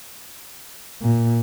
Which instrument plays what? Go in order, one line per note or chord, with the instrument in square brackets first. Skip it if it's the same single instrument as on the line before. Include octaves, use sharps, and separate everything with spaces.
[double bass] A#2